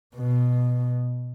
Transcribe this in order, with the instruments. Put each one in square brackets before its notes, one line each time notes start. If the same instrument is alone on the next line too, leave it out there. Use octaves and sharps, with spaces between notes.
[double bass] B2